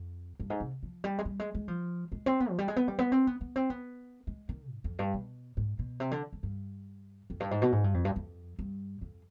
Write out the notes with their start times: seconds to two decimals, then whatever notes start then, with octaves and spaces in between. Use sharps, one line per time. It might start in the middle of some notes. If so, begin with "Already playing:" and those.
Already playing: F2
0.40 G2
0.50 G#2
0.60 C3
0.83 F3
1.04 G3
1.19 G#3
1.25 G3
1.39 G#3
1.55 G#3
1.68 F3
2.12 G#3
2.26 C4
2.40 B3
2.50 F3
2.58 G3
2.68 G#3
2.76 B3
2.88 G3
2.99 B3
3.12 C4
3.27 B3
3.41 B3
3.56 C4
3.70 B3
4.27 G#3
4.49 D#3
4.71 G#2
4.84 F2
4.99 G2
5.14 B2
5.57 G#2
5.79 B2
6.00 C3
6.11 D3
6.33 G#2
6.43 G2
7.30 F2
7.40 G2
7.51 G#2
7.62 B2
7.72 G#2
7.84 G2
7.94 F2
8.05 G2
8.16 F2
8.59 G2
9.01 F2